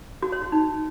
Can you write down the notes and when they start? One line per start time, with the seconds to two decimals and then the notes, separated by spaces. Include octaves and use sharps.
0.23 F#4
0.32 C#5
0.42 F#4
0.52 D#4